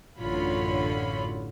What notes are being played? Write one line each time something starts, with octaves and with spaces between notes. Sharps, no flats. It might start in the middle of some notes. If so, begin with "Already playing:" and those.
A1 F#2 D3 F4 C#5 B5